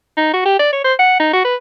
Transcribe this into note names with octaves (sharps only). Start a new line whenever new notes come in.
D#4
F#4
G4
D5
C#5
C5
F#5
D#4
F#4
B4